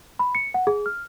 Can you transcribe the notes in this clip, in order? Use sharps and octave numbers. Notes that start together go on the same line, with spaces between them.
B5
C#7
F#5
G#4
F6